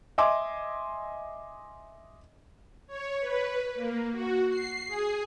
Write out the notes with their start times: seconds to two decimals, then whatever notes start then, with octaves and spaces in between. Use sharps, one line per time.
0.18 D#5 E5 G#5 C6 D6
2.87 C#5
3.20 B4
3.75 A#3
4.11 F#4
4.49 C7
4.87 G#4